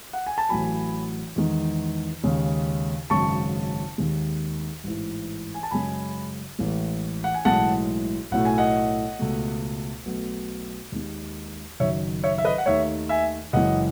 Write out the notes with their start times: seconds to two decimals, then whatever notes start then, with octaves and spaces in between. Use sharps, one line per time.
0.13 F#5
0.27 G#5
0.38 A5
0.49 A1 A2 F#3 G#5 B5
1.36 E2 D#3 G#3
2.24 D#2 C#3 G#3
3.10 G#1 F#2 C#3 G#3 A5 C#6
3.98 D#2 D#3 G#3
4.84 A1 G#2 E3
5.54 G#5
5.63 A5
5.71 F#2 C#3 G#3 G#5 B5
6.59 A1 A2 G#3
7.24 F#5
7.34 G#5
7.45 B1 A2 E3 G#3 F#5 A5
8.31 B1 A2 F#3 A3 F#5
8.45 G#5
8.58 D#5 F#5
9.19 C#2 B2 A3
10.06 B1 B2 A3
10.92 D#2 D#3 G#3
11.80 F#1 F#2 D#3 C#5 E5
12.23 C#5 E5
12.38 E5
12.45 B4 D#5
12.58 F#5
12.66 D#2 D#3 A3 C#5 E5
13.09 E5 G#5
13.53 F#1 F#2 E3 G#3 D#5 F#5